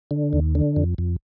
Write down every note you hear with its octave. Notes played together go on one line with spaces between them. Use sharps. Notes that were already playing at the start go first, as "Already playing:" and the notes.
D3
D#2
D3
F2
F2